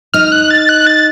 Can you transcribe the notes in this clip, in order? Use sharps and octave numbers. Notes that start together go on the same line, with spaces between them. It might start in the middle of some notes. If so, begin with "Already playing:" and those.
D#4 F6
F#6
A6
F#6
A6